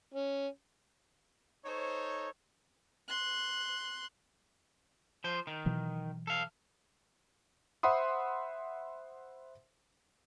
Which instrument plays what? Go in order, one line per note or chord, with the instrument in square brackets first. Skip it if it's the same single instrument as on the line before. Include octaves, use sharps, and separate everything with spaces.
[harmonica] C#4
[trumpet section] D#4 A4 C#5 [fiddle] C5
[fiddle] C6 F#6
[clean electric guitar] F3 C5
D#3
[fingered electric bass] B2 E3 F#3
[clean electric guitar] A4 F5
[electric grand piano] C5 E5 F#5 B5 C6 D#6